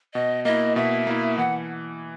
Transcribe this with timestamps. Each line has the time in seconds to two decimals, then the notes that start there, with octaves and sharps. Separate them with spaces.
0.14 B2 D#5
0.45 A#3 E4 D#5
0.76 B2 E5
1.07 A#3 E4
1.38 E3 F#5